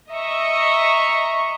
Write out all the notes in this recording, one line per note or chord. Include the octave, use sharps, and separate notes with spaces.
D#5 E5 A#5 C#6